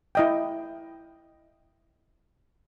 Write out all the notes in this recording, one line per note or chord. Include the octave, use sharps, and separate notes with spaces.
E4 D#5 G5